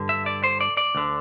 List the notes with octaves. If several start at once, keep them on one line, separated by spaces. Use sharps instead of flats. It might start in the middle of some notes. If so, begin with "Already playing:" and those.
Already playing: G2 D3
E5
D5
C5
D5
D5
D2 D3